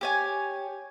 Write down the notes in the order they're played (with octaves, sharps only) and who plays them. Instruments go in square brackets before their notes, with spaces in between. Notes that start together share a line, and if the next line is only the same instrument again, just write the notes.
[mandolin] G4 C#5 G#5